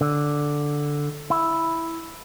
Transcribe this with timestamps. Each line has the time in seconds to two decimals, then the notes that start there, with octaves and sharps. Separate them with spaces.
0.01 D3
1.30 E4